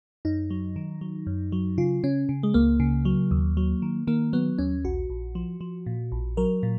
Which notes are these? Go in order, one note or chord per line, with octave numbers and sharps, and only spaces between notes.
F#2 D#4
F#3
D#3
F#3
F#2
F#3
C#3 F4
C#3 C#4
C#3
G#3
C#2 A#3
C#3
F#3
D#2
F#3
D#3
D#3 A#3
F#3 B3
D#2 C#4
A#1 F#4
A#1
F3
F3
A#2
A#1
F#3 A#4
A#2